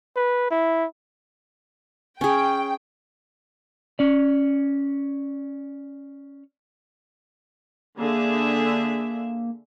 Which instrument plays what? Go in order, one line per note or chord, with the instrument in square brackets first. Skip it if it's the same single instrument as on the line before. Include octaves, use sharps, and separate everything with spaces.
[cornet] B4
E4
[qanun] C#4 G#4 [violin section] G5
[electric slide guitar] C#4 D5
[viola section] D3 G#4 E5 [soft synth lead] A#3